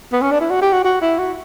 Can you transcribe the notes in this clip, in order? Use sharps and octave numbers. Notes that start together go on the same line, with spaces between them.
B3
C#4
D4
E4
F#4
G4
F#4
F#4
E4
F#4